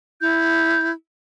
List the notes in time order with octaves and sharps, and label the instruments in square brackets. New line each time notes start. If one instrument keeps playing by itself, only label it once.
[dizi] E4 [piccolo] G6